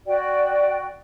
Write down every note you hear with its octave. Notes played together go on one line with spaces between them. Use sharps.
F#4 D5 G5